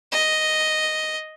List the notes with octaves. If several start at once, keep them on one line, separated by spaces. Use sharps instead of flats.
D#5